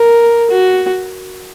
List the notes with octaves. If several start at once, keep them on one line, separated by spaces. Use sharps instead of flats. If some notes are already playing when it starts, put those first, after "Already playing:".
Already playing: A#4
F#4